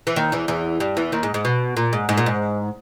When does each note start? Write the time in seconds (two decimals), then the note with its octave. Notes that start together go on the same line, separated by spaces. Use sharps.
0.07 E3
0.16 D#2 D#3
0.32 E2 E3
0.48 E2 E3
0.80 G2 G3
0.97 E2 E3
1.12 D#2 D#3
1.23 G#2
1.34 G#2
1.45 B2
1.77 A#2
1.93 G#2
2.09 G#2
2.18 A#2
2.26 G#2